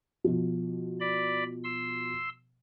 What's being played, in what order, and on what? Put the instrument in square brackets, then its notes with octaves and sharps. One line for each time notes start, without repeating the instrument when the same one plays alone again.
[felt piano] B2 F3
[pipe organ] D5 B5
C6 E6